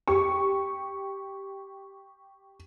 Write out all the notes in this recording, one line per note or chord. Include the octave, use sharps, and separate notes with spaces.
G4 C#6